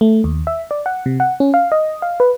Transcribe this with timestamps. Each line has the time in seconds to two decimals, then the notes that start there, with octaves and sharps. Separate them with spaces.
0.01 A3
0.24 D#2
0.47 E5
0.71 D5
0.86 F#5
1.06 C3
1.20 F#5
1.40 C#4
1.54 F5
1.72 D#5
2.02 F5
2.20 B4